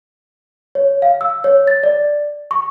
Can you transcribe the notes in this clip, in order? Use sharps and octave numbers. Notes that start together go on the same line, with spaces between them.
C#5
F5
E6
C#5
A6
D5
C#6